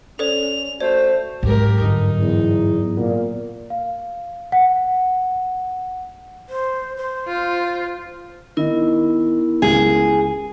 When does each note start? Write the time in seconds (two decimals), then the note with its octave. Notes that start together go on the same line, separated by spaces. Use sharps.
0.19 C#4 A4 C5 D5 F7
0.80 A3 F#4 C5 D5
1.43 F1 G#2 F#3 G4 A#4
1.82 G2 D3 D#4
2.20 E2
2.97 A#2 B3
3.70 F5
4.52 F#5
6.49 C5
6.97 C5
7.28 F4
8.57 D#3 B3 E4 A#4 D#5
9.62 C#2 G#4